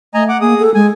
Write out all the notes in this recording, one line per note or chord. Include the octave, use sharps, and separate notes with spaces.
A3 D#5 G#5 A#5
F#5 D6
A#3 G#4 D#6
A4
G#3 G#5